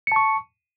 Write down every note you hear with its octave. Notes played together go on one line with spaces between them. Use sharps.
A5 C#6 C#7